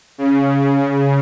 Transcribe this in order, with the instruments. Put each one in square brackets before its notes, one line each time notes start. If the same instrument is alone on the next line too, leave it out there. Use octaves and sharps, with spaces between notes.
[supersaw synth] C#3